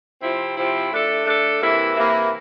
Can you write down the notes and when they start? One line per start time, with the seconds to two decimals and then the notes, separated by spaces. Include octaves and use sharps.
0.21 C3 F3 C4 E4
0.56 C3 F3 C4 E4
0.92 A3 D4 A4
1.25 A3 D4 A4
1.60 C3 E3 A#3 E4
1.95 C3 E3 A#3 E4